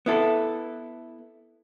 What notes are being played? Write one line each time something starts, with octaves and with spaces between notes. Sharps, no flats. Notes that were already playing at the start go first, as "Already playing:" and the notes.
B3 E4 A4